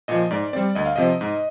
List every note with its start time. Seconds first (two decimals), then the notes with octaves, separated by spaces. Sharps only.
0.08 A#2 F3 D#5
0.31 G#2 D5
0.53 G3 C4 D5
0.75 D2 D#5
0.85 F5
0.96 C3 F3 C4 D#5
1.21 G#2